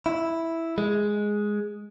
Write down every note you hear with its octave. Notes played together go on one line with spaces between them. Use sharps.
E4
G#3